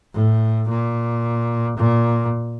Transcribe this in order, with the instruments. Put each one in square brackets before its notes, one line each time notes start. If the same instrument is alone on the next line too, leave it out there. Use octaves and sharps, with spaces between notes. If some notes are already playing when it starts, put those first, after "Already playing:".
[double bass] A2
A#2
A#2